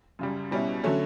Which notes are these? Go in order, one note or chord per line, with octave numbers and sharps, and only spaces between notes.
F#2 C#3 G3
B2 G3 C#4 E4
D3 F#3 A3 C#4